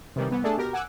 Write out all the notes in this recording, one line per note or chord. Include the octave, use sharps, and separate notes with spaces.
C3 D#3 E3 G3
C2 E3 B3
A3 D4 G#4 A4 A5
B2 G4 A#4
F#5 G#5 D6 E6 F#6